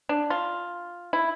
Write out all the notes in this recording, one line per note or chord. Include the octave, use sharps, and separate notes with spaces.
D4
F4
E4